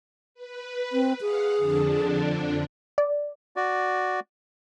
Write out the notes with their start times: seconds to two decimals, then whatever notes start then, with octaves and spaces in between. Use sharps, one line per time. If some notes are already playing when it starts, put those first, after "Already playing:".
0.34 B4
0.92 C4
1.21 G#4 F5 F#5
1.57 F2 D3 D4
2.98 D5
3.56 F#4 D5